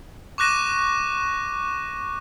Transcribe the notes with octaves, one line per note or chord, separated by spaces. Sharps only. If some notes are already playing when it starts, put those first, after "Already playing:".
C#6 D6 F#6 A#6 D#7 E7